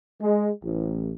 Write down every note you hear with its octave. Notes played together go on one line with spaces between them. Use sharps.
G#3
A1